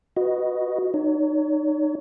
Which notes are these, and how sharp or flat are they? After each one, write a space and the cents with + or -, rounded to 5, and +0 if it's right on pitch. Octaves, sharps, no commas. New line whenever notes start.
F#4 -5 B4 +0 D#5 +0
D#4 -25 C#5 +35